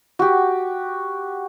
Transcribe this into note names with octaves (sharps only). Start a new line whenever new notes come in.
F#4 G4